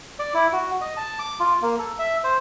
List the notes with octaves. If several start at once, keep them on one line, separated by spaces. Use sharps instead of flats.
D5
E4
F#4
D#5
A5
D6
F4
A#3
A4
E5
C5